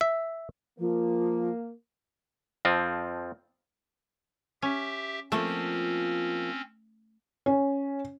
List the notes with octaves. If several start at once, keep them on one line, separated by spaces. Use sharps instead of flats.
E5
F3 A#3
F2 F3 C4
C#4 G4 E5
F3 A3 A#3 C4 C#4 F4
C#4